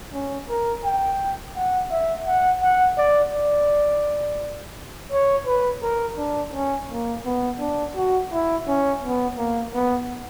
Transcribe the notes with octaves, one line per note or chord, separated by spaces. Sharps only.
C#4
A#4
G5
F#5
E5
F#5
F#5
D5
D5
C#5
B4
A#4
D4
C#4
A#3
B3
D4
F#4
E4
C#4
B3
A#3
B3